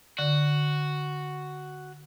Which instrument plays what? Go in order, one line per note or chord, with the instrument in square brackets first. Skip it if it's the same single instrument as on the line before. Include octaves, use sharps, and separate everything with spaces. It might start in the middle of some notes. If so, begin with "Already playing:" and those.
[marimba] D3 [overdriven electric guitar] F#4